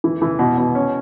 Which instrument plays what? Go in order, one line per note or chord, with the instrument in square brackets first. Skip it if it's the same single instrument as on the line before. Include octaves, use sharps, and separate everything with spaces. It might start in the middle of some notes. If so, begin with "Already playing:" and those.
[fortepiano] E3
E3
B2
B2
C#4